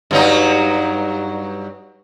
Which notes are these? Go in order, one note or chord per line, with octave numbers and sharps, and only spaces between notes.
G2 F#3 D#4